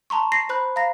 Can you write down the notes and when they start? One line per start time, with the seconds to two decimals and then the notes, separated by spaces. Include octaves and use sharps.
0.10 A5 A#5 C6 C#6
0.32 A#6 C7
0.49 C5 B5 F#6
0.76 F5 A#5 A#6